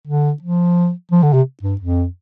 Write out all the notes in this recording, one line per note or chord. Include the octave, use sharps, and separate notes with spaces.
D3
F3
F3
D3
C3
G2
F2